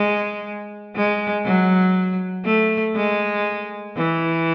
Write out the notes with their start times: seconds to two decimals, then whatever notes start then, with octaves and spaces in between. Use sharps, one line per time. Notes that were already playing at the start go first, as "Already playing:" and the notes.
Already playing: G#3
0.95 G#3
1.45 F#3
2.45 A3
2.96 G#3
3.96 E3